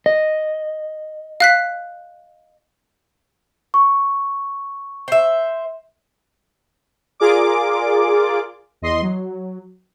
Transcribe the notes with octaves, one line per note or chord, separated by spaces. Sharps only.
D#5
F5 F#6 B6
C#6
C5 E5
F4 G#4 A#4 D5 D6
E2 D#5 C6
F#3